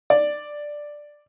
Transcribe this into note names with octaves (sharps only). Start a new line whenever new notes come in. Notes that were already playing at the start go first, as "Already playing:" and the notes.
D5